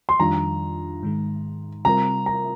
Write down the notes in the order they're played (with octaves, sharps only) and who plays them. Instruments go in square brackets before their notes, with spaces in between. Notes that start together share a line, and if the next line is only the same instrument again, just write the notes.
[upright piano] C6
[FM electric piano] F2 D#3 G3 D4 F4 [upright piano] A#5
[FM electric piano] G#2 D#3 G#3
[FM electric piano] C3 G3 C4 F4 A#4 [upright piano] A#5
[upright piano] A#5